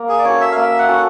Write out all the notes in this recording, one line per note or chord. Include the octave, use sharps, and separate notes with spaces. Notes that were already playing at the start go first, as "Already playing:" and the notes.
Already playing: A#3
G#4
D5
C#4 F#4 A4 C#5
E5
F5
A#3 E5
F#5
C#4 F#4 A4